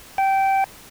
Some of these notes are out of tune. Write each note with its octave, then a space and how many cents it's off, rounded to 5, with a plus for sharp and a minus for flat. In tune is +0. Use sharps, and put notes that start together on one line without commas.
G5 -15